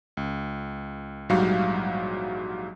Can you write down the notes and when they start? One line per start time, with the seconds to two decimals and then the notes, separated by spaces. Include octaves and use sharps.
0.17 C#2
1.29 A#1 G#2 F#3 G3 F#4 F5